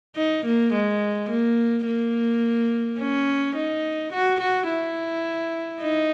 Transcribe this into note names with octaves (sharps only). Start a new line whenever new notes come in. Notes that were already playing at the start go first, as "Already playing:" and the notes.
D#4
A#3
G#3
A#3
A#3
C#4
D#4
F#4
F#4
E4
D#4